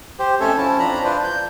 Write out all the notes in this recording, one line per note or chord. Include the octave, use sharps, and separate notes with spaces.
G4 C5
F2 A3 C#4 A4 C#5
F3 C#4 E4 A5
F2 F3 D4 A#5 B5
D4 E4 F4 B4 C5 D5
G6